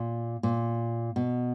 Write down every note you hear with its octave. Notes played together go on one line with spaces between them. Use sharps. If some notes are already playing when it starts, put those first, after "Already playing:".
Already playing: A#2
A#2
B2